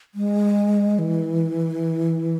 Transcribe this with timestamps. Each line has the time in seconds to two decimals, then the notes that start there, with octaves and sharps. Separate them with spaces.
0.15 G#3
0.99 E3